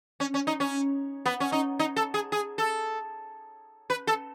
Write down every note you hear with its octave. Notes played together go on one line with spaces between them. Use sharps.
C#4
C#4
D#4
C#4
B3
C#4
D#4
D#4
A4
G#4
G#4
A4
B4
A4